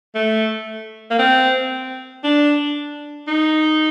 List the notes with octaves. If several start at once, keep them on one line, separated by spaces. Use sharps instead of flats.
A3
A#3
C4
D4
D#4